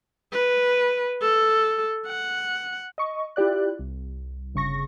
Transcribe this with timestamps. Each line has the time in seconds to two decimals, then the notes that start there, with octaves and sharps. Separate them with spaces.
0.32 B4
1.22 A4
2.07 F#5
2.98 D#5 C#6
3.36 E4 F4 G4 D5 F#6
3.79 C2
4.54 G1 C#3 C#6 A#6